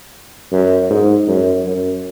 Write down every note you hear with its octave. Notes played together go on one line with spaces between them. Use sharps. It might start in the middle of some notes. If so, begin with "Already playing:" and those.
F#2
G#2
F#2
F#2